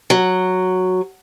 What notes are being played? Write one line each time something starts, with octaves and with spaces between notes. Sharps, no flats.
F#3